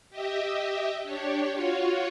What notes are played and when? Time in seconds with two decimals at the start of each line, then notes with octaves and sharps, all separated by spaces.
0.10 G4 D#5 E5
1.03 D4 G4 C#5
1.53 F4 F#4 C#5